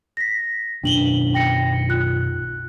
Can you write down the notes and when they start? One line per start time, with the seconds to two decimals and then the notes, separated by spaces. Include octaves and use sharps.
0.17 A#6 B6
0.83 F#2 B2 C#4 D4 F#7 G7
1.34 G5 A#6 C#7
1.89 F4 F#6